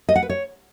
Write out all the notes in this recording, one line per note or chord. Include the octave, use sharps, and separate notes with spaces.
D#5
F#5
B4
C#5